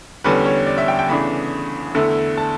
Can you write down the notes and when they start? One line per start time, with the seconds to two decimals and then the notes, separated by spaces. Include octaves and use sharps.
0.24 E2 D3 G3 C#4 B4
0.46 C#5
0.67 D5
0.78 E5
0.88 G5
0.99 G5
1.09 E2 C#3 E3 A3 D4 B5
1.95 E2 D3 A3 E4
2.37 A5